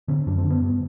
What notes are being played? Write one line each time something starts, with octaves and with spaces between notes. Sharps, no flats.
D3 C4
F#2 D4
C4
D3
B3
G2